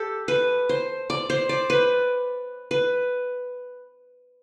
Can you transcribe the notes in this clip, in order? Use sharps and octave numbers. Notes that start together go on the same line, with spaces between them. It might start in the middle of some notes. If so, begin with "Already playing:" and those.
Already playing: G4 A4
B4
C5
D5
C5
D5
B4
B4